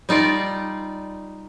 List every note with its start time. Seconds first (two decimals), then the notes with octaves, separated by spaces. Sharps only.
0.09 G3 D#4 F4 D5